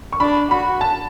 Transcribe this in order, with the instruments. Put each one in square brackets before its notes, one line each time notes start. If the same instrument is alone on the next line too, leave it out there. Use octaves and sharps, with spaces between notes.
[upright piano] C#6
[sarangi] D4 [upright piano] B5
[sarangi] F#4 [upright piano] B5
[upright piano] A5